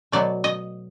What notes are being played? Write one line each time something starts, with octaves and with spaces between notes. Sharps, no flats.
B2 F#3 A3 D5
D#5